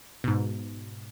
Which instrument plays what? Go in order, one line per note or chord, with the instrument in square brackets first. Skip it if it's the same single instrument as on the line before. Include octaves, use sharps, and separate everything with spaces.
[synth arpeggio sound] G#2 B2